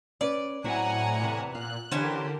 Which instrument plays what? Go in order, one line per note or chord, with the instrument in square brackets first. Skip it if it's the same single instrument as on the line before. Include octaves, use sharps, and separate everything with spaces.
[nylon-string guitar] C#4 B4 [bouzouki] D5
[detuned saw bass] A2 [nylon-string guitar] F#3 C4 E4 [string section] F#5 G#5 A#5
[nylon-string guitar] E2 C3 E3
[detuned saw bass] A#2 [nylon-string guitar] F5 [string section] F#6
[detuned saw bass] D3 [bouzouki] E3 C#4 C5 [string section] G4 A#4